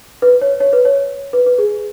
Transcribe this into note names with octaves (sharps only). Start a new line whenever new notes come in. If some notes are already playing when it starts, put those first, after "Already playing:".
B4
C#5
C#5
B4
C#5
B4
B4
G#4